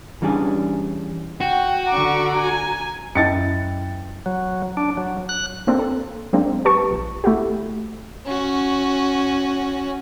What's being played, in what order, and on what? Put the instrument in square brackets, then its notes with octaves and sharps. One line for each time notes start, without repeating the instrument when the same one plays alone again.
[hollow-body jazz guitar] E3 G3 C#4 D4 G#4
[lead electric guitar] F#4 [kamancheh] G5
[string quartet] D3 C#6 D6 [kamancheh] A#5
[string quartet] G#5
[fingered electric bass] F#2 [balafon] C#4 D#5 A5 [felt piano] E4 G5 [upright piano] A6 C#7
[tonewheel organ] F#3
D4
F#3
F#6
[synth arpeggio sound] A#3 C4 D4 A4
A4
F#3 G#3 A#3 C4 D4
G4 B4 A5 C#6
A#1
A3 E4 F#4 G4
[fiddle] C#4 F#4